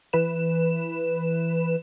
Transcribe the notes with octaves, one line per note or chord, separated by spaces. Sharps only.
E3 B4 E7